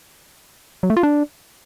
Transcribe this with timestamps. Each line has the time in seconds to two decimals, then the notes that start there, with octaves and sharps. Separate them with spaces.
0.83 F#3
0.90 A3
0.97 F4
1.03 D4